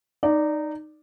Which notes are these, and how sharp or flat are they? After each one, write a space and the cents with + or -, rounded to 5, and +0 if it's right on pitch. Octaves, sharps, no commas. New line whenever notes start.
D#4 -15 D5 +0